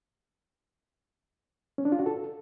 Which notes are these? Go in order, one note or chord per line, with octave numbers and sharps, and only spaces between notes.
C#4
D4
F4
F#4
A4